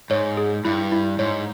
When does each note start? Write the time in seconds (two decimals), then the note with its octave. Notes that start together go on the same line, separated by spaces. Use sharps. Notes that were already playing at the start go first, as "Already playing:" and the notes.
0.10 G#2 C#5
0.37 G#4
0.65 G2 E4
0.92 E4
1.19 G#2 C#5